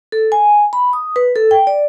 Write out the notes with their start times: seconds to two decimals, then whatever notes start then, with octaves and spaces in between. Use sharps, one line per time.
0.12 A4
0.32 G#5
0.73 B5
0.93 D#6
1.16 B4
1.36 A4
1.51 G5
1.67 D5